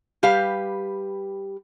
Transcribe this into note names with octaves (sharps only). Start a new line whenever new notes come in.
G3 G4 B4 F5